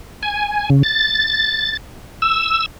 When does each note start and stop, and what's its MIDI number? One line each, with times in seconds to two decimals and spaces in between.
0.23 0.70 80
0.70 0.83 49
0.83 1.77 93
2.22 2.66 88